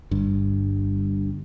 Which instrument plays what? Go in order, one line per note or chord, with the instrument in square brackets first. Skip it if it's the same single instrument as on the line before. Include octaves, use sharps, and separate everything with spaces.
[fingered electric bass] G1 G2